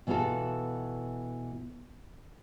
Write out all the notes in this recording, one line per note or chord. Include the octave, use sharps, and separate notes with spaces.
B2 E3 B3 F4 F#4 A4